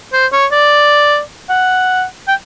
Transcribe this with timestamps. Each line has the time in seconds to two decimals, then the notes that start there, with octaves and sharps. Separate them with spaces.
0.13 C5
0.32 C#5
0.52 D5
1.49 F#5
2.27 G5